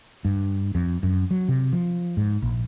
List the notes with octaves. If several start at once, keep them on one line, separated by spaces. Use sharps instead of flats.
G2
F2
F#2
F#3
C3
F3
G#2
A#1